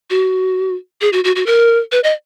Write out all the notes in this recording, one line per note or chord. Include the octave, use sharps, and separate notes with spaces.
F#4
G#4
F#4
F#4
F#4
A#4
B4
D#5